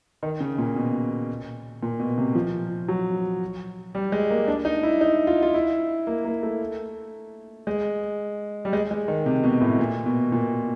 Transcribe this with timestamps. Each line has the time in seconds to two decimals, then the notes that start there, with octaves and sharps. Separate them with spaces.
0.23 D#3
0.40 C#3
0.58 A#2
0.76 B2
1.83 A#2
2.00 B2
2.18 C3
2.35 F3
2.88 F#3
3.95 G3
4.12 G#3
4.30 A#3
4.48 D4
4.65 D#4
4.83 E4
5.01 D#4
5.27 F4
5.42 F4
5.54 E4
6.07 A#3
6.25 A#3
6.43 A3
7.67 G#3
8.65 G3
8.73 G#3
8.91 G#3
9.08 D#3
9.26 C3
9.43 B2
9.61 A2
9.79 A#2
10.06 B2
10.32 A#2